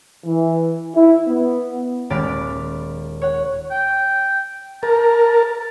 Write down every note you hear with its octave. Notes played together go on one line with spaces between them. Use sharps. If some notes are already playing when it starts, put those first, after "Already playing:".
E3
E4
B3
D#1 G#3 D5 F5 B5
C#5 F#5
G5
A#4 A5